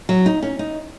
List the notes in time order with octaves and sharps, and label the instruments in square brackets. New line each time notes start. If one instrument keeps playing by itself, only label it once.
[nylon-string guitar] F#3
D#4
C#4
D#4